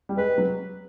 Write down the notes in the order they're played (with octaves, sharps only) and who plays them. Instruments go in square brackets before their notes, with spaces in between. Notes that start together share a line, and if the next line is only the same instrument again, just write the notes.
[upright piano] G3
[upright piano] G#3 [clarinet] B4
[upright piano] F#3